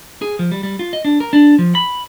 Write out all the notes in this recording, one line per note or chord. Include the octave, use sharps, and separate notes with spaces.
G#4
F3
G3
G3
F4
D#5
D4
A#4
D4
F3
B5